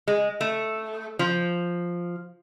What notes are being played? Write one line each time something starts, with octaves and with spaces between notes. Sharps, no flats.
G#3
A3
F3